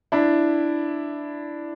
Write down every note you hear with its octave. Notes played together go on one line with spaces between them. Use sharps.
D4 E4